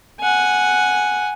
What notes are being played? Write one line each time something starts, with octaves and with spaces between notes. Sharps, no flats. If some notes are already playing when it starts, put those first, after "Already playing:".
F#5 G#5